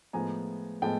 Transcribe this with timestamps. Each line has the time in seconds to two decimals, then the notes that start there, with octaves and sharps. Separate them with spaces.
0.13 A2 F3 G#3 B3 G#5 A#5
0.82 A2 F3 G#3 B3 G5 A5